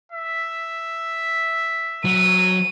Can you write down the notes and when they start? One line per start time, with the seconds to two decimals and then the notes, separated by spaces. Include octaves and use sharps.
0.12 E5
2.05 F#3 D#7